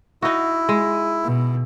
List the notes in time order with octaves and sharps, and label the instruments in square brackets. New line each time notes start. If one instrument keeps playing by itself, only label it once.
[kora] D#4 F#4 [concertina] E4
[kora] G#3
[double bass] B2